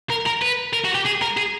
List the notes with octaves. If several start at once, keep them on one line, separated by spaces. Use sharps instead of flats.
A#4
A#4
B4
A#4
F#4
G4
G#4
A#4
G#4